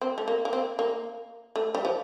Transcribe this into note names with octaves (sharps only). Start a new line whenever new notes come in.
C4
A3
A#3
A#3
C4
A#3
A3
G3
F3